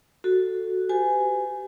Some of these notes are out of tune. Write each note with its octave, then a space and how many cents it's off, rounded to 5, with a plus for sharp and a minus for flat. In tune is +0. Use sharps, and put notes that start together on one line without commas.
F#4 +0 A4 +0
G4 -15 B4 +45 G#5 +0